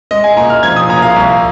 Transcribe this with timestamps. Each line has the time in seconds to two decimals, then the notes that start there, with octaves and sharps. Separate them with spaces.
0.11 G#3 D#5
0.24 G#5
0.37 A#2 A#5
0.50 F6
0.63 F3 G#6
0.76 D#6
0.89 A#2 A#5
1.02 F5
1.16 C2